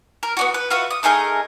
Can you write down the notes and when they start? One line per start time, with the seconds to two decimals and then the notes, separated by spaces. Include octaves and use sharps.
0.23 A#4
0.37 B3 D4 F#4
0.54 B4
0.70 F4 F#4 B4 E5
0.91 D#6
1.03 A3 D#4 G#4 A#4